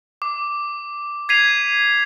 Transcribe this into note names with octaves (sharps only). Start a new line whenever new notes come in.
D6
G#6 B6 C7 D#7 F7